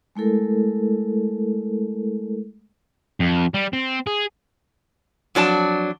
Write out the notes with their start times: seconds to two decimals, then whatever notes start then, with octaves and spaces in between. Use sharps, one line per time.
0.15 G#3 A3 E4 A4 A#4
3.20 F2
3.54 G3
3.73 C4
4.07 G#4
5.35 F2 F#3 D4 A5